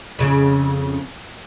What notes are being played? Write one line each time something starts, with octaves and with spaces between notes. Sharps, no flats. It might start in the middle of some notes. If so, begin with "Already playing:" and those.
F2 C#3